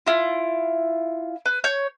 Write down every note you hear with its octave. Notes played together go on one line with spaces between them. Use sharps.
E4 F4
B4
C#5 G6